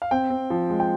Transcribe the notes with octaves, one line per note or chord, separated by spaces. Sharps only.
F5
C4 G5
C4
F3
G#3
G5